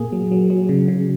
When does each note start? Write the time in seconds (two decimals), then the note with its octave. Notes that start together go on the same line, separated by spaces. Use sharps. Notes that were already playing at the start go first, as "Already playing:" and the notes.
Already playing: A#2 A#3 G#4
0.12 F#3
0.32 F#3
0.50 F#3
0.69 C#3
0.88 C#3